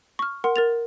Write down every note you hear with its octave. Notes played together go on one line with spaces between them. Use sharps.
C#6 F6
A#4 F#5 C6
A#4 A6 F7